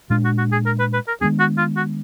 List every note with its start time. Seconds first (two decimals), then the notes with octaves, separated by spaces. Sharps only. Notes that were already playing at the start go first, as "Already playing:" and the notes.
0.10 A#2 G#3 D4 F4
0.24 F#4
0.38 F#4
0.52 G#4
0.66 A#4
0.79 B4
0.93 B4
1.07 A#4
1.21 D#3 G#3 B3 D4 G#4
1.39 F#4
1.58 F4
1.76 F#4